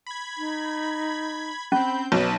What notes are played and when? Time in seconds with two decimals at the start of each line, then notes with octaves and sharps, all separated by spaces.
0.07 B5 G#6
0.38 D#4
1.72 C4 C#4 B5 G6
2.12 B1 B3 D#4 B4 A5